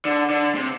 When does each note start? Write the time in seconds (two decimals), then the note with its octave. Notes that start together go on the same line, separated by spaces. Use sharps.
0.05 D3
0.30 D3
0.55 C3